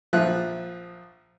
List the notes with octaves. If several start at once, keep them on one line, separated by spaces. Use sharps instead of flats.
A#1 F3 E5 F#6